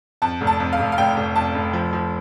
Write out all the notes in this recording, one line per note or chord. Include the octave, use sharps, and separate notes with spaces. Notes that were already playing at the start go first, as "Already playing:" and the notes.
F2 A5
F1
A5
F2
F5
F1
F5
F1 G5
F1
F2 A5
F1
F3
F3